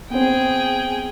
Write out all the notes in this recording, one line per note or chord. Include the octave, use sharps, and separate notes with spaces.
B3 C4 G#4 G5